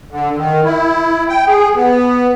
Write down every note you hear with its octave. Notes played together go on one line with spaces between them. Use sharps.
D3
D#3
E4
G5
G#4
B3